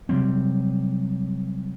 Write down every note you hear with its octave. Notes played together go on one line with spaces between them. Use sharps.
C3 F#3 G3 C4